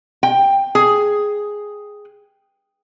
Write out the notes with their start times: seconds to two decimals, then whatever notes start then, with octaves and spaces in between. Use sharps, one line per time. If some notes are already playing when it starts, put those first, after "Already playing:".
0.23 G5
0.75 G#4